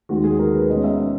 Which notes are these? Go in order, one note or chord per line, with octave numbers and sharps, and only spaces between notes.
D#2 D#3 G#3 F#4
G#4
A#4
B4
B2 G#3 C#4 D#5
E5